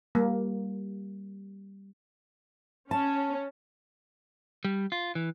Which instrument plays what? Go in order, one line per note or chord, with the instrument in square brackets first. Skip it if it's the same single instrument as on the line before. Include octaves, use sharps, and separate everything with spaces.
[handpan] G3 [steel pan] A#3
[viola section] C#4 [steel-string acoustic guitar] A5
[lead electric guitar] G3
F4
E3